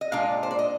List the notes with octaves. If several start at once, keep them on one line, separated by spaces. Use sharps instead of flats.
D#5
A#2 G#3 D4 F5
C5
D5
D#5